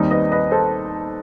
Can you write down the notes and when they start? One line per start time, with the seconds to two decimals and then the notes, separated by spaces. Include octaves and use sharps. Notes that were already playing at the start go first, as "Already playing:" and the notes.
Already playing: D#2 D#3 G3 C4 D#4
0.11 B4 D#5
0.32 B4 D#5
0.51 A4 C5